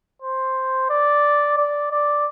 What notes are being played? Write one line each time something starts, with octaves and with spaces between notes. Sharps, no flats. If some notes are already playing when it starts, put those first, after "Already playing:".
C5
D5
D5
D5